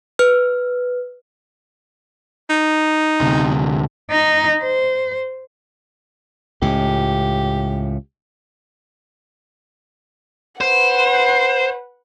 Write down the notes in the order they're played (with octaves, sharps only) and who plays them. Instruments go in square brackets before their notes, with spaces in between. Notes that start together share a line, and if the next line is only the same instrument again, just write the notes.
[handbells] B4 F6
[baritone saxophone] D#4
[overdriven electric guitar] D2 C3
[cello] D#4
C5
[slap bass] C#2 A2 [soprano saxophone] G4
[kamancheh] B4 F#5 [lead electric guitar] C5